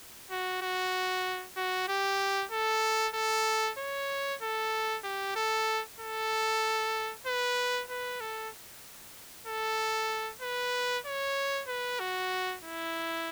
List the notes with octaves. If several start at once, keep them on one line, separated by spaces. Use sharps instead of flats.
F#4
F#4
F#4
G4
A4
A4
C#5
A4
G4
A4
A4
B4
B4
A4
A4
B4
C#5
B4
F#4
E4